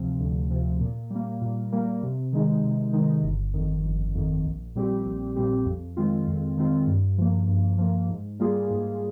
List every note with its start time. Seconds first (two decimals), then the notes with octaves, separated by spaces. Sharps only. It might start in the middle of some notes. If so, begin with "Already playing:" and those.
Already playing: D2 C3 F3
0.19 D2
0.51 C3 F3
0.81 A#2
1.11 G3 A#3
1.41 A#2
1.72 G3 A#3
2.03 C3
2.33 D#3 G#3 D#4
2.63 C3
2.93 D#3 G#3 D#4
3.23 G1
3.54 F2 D#3
3.84 G1
4.15 F2 D#3
4.45 A#1
4.75 A#2 G3 C4 G4
5.05 A#1
5.36 A#2 G3 C4 G4
5.66 F2
5.97 D#3 G#3 C4 F4
6.27 F2
6.57 D#3 G#3 C4 F4
6.87 G2
7.18 F3 A#3
7.48 G2
7.78 F3 A#3
8.09 G#2
8.39 G3 A#3 F4 G#4
8.70 G#2